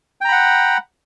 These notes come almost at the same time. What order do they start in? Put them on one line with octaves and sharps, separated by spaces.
G5 A#5 B5 F#5